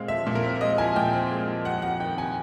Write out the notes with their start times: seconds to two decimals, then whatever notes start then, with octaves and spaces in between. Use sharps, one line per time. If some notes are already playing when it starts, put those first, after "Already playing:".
Already playing: A#2 G#3 C4 F5
0.08 F3 E5
0.27 A#2
0.35 A#4
0.44 C4
0.61 G#3 D#5
0.78 F3 G#5
0.96 A#2 G5
1.13 C4
1.31 G#3
1.48 F3
1.65 F2 F#5
1.82 F2 F#5
2.00 D#3 G5
2.17 C3 G#5